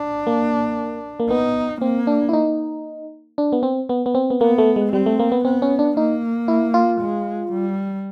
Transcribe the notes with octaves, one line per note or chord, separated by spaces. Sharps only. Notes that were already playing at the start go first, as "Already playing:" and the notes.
Already playing: D4
A#3
A#3
B3 D#4
A#3 C4
D4
E4
D#4
D4
B3
C4
B3
B3
C4
B3
A#3 B3
A3
G#3
G3 C4
A3
A#3
B3
B3 C4
C#4
D4
A#3 D#4
E4
F4
G#3
G3